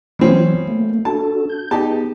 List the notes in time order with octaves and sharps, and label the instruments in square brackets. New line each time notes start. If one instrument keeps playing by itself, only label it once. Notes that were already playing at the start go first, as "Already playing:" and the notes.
[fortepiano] B2 C4 C#4 [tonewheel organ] E3 F#3
[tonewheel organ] A3 A#3
[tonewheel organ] D4 F#4 A4 [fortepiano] A5
[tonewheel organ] G6
[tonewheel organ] B3 G#4 [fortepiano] D#4 G4 A5